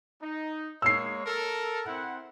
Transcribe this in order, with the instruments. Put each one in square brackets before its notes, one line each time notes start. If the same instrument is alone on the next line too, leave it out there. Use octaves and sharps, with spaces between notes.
[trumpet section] D#4
[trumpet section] G#3 A#3 C#5 [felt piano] E6 C7
[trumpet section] A4 A#4
C4 E4 F#5